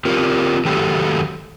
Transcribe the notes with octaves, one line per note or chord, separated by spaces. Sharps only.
C4 F4 G4 A#4
D#3 F#3 A3 G4 A4